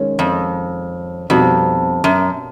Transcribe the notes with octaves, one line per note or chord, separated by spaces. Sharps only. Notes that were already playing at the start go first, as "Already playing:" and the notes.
Already playing: D#3 G#3 C#4
F2
F2 B2 G3 C4 D#4 F#4
F#2